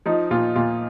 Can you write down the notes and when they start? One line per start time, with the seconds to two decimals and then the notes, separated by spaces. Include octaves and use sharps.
0.06 F3 D#4
0.31 A#2 F4
0.56 A#2 F4